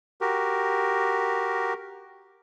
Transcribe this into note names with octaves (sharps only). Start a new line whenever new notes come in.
F#4 G4 A#4